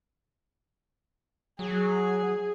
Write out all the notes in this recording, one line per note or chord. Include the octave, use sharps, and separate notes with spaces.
F#3 G#4